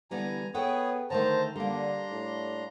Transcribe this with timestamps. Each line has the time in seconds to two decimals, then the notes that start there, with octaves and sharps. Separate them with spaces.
0.11 D3 E3 G3 B3 G#5 A#5
0.54 B3 G#4 A4 B4 C#5 F#5 G5
1.10 D3 D#3 A3 C5 A5 A#5
1.56 D3 G3 A#3 D4 A#5 C6
2.10 A2